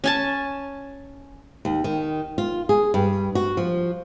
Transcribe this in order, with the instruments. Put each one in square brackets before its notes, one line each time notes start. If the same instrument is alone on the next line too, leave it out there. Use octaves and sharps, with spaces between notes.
[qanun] C#4 G#5 A5
[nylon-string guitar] D#2
D#3
F4
G#4
G2
F#4
F3